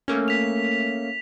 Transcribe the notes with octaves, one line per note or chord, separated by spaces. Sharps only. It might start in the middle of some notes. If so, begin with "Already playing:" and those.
A3 A#3 C#4
B6 F7